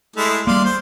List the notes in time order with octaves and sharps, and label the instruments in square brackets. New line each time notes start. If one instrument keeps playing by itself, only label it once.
[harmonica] G#3 A3 E4
[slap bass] G3 A#3 [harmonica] D5 F5 C6
[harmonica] C5